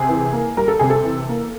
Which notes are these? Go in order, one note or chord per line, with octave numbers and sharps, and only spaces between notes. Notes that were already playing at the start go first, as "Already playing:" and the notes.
Already playing: C3 G#4
E3
A#3
G3 A#4
A4
C3 G#4
A4
E3
A#3